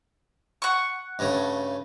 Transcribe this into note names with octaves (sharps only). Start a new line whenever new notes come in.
F#5 C#6
G2 C#3 A3